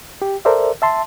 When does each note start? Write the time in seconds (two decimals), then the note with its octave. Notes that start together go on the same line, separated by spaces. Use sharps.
0.22 G4
0.45 A4 A#4 C5 D5 E5
0.82 E5 A5 C6